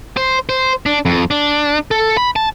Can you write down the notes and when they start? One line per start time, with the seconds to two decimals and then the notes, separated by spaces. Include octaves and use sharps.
0.17 C5
0.49 C5
0.86 D4
1.05 F2
1.31 D4
1.91 A4
2.17 B5
2.36 A5